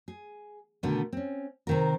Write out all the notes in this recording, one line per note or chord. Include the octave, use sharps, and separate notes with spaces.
G#4
B2 D3 D#3 A3 B3
C4 C#4
C3 D#3 A#4